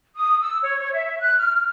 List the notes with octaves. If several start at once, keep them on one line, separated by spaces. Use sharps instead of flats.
D#6
E6
C#5
C#5
E5
F#6
F6